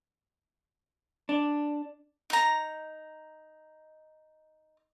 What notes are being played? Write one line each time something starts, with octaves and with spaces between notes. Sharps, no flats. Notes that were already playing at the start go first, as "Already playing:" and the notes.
D4
D#4 A#5